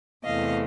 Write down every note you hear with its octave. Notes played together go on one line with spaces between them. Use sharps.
E2 C3 E3 A3 D#5 F5